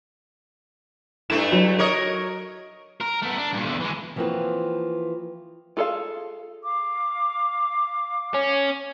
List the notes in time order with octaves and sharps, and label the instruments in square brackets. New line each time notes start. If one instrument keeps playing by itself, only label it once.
[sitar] G2 A3 E4 [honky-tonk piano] E7
[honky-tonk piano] F#3
[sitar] A#4 C#5 D#5
[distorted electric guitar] A#4
A3 B3
D4
G2 A#2
E2 D3
E3 G#3
[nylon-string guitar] E3 F3 A#3 C4 F#4 B4
[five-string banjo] F4 G#4 A4 C5 F5
[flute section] F5 D6
[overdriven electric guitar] C#4